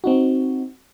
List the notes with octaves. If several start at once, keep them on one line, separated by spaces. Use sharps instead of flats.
C4 D#4 F#4